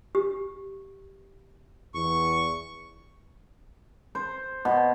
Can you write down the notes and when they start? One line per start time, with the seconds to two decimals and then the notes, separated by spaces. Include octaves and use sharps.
0.15 G4
1.94 E2 C#6
4.15 C5
4.65 B2